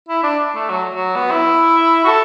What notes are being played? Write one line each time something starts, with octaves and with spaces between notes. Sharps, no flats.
E4
D4
A3
F#3
F#3
B3
E4
F#4
A4